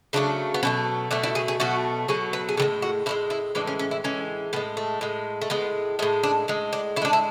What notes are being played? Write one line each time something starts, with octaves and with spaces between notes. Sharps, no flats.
C#3 F#3 A3 D4
B3
B2 F#3 A3 C#4
B2 F#3 A3 D4
E4
G#4
G#4
B2 F#3 A3 F#4
B2 F#3 A3 G#4
B4
G#4
A2 E3 G#3 A4
F#4
A2 E3 G#3 E4
E4
A2 E3 G#3 D4
C#4
C#4
E4
A2 E3 G#3 C#4
A2 G#3 B3
A3
A2 G#3
A3
A2 G#3 B3
A2 G#3 A3
D4
A2 G#3
D4
A2 E4
G#3 D4
E4